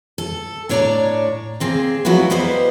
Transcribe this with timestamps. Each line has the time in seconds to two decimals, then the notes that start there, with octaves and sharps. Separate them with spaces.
0.18 A4
0.69 A2 D4 C#5 D5 A5 A#5
1.60 A#3 C4 G#4
2.05 F3 F#3 A3 B3 E4 F#4
2.30 G3 A#3 B3 B4 C5 D#5